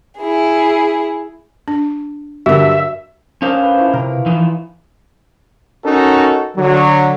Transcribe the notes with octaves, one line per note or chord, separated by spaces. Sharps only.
E4 G#4
D4
G2 D3 F#3 F#4 A#4 E5
C#4 D4 A#4 C5 F5 D#6
B4
F3 E4 C#5
C3 A#4
E3 F3 D#4
C#4 D#4 F#4 A4 A#4
D3 F#3